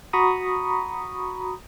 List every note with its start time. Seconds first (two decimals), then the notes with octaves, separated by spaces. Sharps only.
0.13 F#4 A#5 B5 C#6 D#6